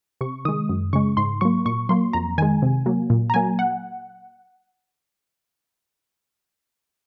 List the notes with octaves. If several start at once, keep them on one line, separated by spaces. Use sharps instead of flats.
C3 C#6
D#3 G#3 D#6
F#2
C#3 G#3 C#6
G#2 C6
F#3 A#3 C#6
A#2 C#6
F#3 A#3 C6
F2 A#5
D#3 G#3 G#5
C3
F#3 A#3
A#2
A#5
F#3 A#3 G#5
F#5